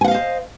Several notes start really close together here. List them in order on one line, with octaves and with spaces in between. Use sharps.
G#5 F#5 F5 D#5 C5